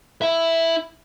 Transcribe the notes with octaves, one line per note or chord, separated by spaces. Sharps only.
E4 E5